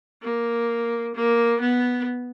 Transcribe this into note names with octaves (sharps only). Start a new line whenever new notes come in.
A#3
A#3
B3